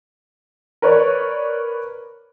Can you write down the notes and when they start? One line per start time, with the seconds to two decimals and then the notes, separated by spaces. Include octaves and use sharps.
0.82 A#4 B4 C#5 D5